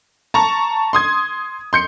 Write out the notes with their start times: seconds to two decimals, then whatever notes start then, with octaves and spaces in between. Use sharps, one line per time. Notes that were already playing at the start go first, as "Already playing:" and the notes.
0.34 A5 A#5 C#6
0.93 C6 D#6 G#6
1.73 C6 G6 C#7